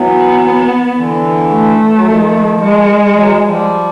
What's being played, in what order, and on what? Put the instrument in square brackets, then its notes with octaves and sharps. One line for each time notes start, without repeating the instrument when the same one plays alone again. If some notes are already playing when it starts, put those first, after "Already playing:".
Already playing: [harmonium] E3 F#3 [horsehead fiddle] B3
[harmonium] D3 E3
[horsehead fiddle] A3
[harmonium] F#3
D#3 F3
[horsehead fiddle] G#3
[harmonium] F3
E3 F#3
F3 G3